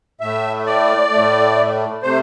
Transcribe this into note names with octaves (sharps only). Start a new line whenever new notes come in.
A2 A3 E5
D5
A2 A3
C3 A3 C5